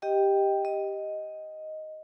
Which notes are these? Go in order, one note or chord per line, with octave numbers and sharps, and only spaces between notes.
G4 D#5 G5
D#5